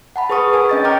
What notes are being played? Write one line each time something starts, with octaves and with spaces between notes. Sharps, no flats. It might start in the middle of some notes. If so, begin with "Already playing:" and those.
F#5 A5 B5
G#4 B4 C#6 D#6
A#4 G#5
C#4 D#5 A6
G5 A#5 C#6 D6 F6 G6